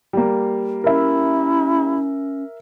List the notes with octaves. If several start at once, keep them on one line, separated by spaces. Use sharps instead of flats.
G3 A#3
C#4 E4 A#4 E5